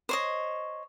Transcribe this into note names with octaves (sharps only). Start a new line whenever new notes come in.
C5 C#5 D#5